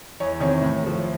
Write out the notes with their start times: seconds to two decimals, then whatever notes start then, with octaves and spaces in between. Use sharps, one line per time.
0.20 E2 C#5
0.40 C3 D#3 C#5
0.61 A2
0.84 F3 A3